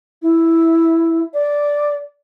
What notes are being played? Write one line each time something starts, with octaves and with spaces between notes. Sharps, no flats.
E4
D5